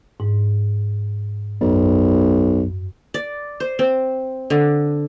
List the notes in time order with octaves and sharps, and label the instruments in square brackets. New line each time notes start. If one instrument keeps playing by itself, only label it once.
[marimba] G#2
[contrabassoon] B1 [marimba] F#2
[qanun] D5
C5
C4
D3